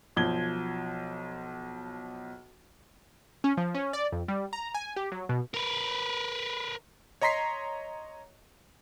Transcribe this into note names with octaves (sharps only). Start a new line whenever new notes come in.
B1 F3 G#6 G7
C#4
F3
C#4
D5
F2
G3
A#5
G#5
G4
F#3
B2
A#4 B4
C#5 D#5 A#5 C6 B6 C7